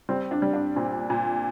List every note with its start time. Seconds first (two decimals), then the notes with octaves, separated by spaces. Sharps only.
0.09 G3 C4
0.31 D4
0.42 G3
0.53 D4
0.76 A#2 C4
1.10 A#2